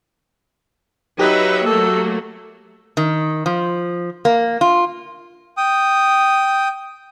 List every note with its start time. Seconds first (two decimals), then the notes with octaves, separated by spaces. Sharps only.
1.19 F#3 D#4 G4 B4 E5
1.66 F#3 A3 A#3 A4
2.97 D#3
3.46 F3
4.25 A#3
4.61 F4
5.57 G5 D#6